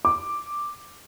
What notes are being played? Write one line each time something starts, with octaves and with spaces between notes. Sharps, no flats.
D6